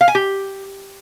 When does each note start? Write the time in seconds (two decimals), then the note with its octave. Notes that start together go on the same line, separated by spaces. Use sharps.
0.01 F5
0.08 G#5
0.15 G4